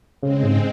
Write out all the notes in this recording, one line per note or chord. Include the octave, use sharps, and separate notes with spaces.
C#3 G#3 C4
G#2